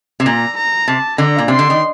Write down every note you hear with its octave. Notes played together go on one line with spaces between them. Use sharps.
C3
A#2 A#5
A#5
C3 A5
D3 A#5
A#2
C3 C6
D3
D#3